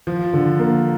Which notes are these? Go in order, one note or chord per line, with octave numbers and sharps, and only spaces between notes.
F3
D3
A#3